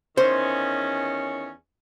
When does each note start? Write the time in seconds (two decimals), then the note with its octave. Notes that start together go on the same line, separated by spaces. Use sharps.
0.17 E2 D#3 C#4 C5